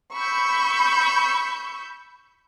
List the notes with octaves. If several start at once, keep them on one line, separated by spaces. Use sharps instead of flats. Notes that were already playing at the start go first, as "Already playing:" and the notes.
B5 C#6 E6 G6